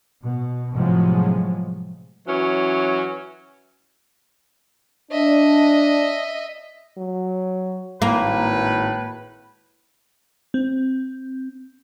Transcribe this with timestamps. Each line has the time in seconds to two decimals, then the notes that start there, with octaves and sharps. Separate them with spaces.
0.24 B2
0.76 A2 C3 F3 F#3 G#3
2.27 E3 F#3 C#4
5.12 D4 D#5 E5
6.97 F#3
8.02 G#1 A2 A#3 B4
10.54 C4